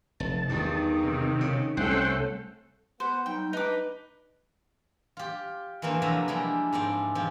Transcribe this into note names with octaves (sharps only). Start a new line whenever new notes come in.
F1 A5
E2 G2 D#3
C3
C#3
C2 A3 C#4 A4 C5 F#5 G5
B3 B4 C5 F#5
F#3 G3 D#4 G5
D4 D#4 B4 D6
F4 G4
E3 A3 A#3 C4 D4
C3 F3 F#3 B4 E5 A#5
F3 G3 G#3 A#3 D4 E4
G#2 G#3 C4 D5
C3 F3 C4